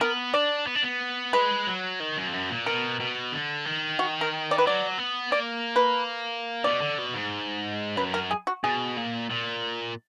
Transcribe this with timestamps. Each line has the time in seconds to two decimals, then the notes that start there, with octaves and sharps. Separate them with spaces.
0.01 B3 A#4
0.34 D4 D5
0.67 B3
0.75 D4
0.83 B3
1.33 G#3 B4
1.67 F#3
2.00 D#3
2.17 F#2
2.28 F2
2.33 F#2
2.50 A#2
2.66 B2 A#4
3.00 B2
3.32 D3
3.66 D#3
3.99 F#4
4.21 A#4
4.51 D5
4.58 B4
4.66 F#3 D5
4.99 B3
5.32 A#3 D5
5.76 B4
6.64 B2 D5
6.81 D3
6.98 B2
7.14 G#2
7.97 F#2 B4
8.14 A#4
8.31 G#4
8.47 F#4
8.64 B2 G#4
8.97 A#2
9.30 A#2